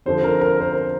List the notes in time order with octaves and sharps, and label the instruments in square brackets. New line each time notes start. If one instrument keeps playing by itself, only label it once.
[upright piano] F2 D3 F3 C5
A#4
A#4
C5
A#4